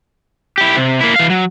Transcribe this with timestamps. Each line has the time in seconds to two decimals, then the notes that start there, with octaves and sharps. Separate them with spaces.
0.58 E4 G4
0.77 C3
1.00 A#3 E4
1.16 E3 F5
1.30 F#3